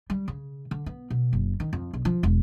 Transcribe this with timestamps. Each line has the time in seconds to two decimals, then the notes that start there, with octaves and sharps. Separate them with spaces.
0.10 G3
0.28 C#3
0.71 D3
0.86 B3
1.10 B2
1.33 F#1
1.60 D#3
1.73 F2
1.93 B1
2.05 F3
2.23 E1